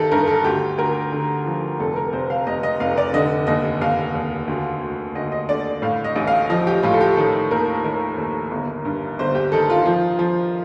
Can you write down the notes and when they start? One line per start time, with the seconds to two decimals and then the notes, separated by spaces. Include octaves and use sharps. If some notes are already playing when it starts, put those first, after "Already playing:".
Already playing: G1 D#3 G4 A4
0.12 G2 A#4
0.27 A4
0.44 D2 G4
0.78 D2 A#4
1.12 D3
1.46 F3
1.80 F1 A4
1.96 A#4
2.13 F1 C5
2.30 F5
2.47 F1 D#5
2.63 D#5
2.80 F1 F5
2.97 D5
3.13 D3 D#5
3.47 D#2 D#5
3.81 D#2 F5
4.15 D#2
4.48 D2
4.81 D2
5.15 D2 D#5
5.32 D#5
5.49 D3 D5
5.82 A2 F5
6.04 D#5
6.16 A1
6.27 F5
6.50 F3 D#5
6.67 G4
6.83 A2 F4
6.93 A4
7.01 G4
7.16 D#3 A4
7.51 D#2 A#4
7.84 D#3 A#4
8.18 D#2
8.51 G1
8.85 G2
9.19 G1 C5
9.35 G4
9.52 D#3 A4
9.70 F4
9.86 F3
10.19 F3